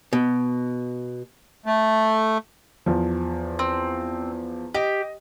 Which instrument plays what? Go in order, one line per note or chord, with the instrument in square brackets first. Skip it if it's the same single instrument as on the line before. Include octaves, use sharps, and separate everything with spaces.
[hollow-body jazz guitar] B2
[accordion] A3
[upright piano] E2 F3
[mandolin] C4
[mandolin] G4 [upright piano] D#5